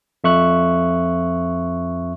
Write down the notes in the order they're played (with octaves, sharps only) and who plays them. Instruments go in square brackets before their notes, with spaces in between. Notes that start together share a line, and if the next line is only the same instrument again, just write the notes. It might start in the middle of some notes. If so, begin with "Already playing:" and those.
[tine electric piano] F2 E5 C#6 F#6